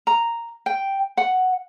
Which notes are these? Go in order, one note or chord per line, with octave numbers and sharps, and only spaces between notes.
A#5
G5
F#5